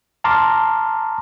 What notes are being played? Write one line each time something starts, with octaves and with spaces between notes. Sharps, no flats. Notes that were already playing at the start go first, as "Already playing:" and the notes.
A5 A#5 C6 D6 F6